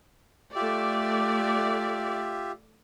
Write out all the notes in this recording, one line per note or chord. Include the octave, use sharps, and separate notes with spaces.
A3 F4 G4 D5 E5